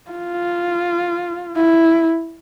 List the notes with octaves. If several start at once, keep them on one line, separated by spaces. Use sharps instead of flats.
F4
E4